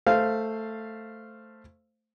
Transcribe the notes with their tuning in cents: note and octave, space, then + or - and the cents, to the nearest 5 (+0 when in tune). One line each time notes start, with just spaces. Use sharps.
A3 +5 C5 +0 F5 -10